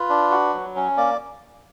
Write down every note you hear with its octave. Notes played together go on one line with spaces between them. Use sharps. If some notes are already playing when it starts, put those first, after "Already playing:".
Already playing: F4 B4
D4
F#4
F#3
C#4
A#3 D5